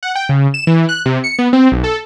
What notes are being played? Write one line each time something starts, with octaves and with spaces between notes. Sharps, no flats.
F#5
G5
C#3
E7
E3
F#6
C3
C#7
B3
C4
B1
A4